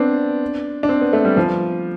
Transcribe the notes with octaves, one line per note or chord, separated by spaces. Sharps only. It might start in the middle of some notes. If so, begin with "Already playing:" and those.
Already playing: B3 C4 D4
D4
C4
B3
A3
G3
F3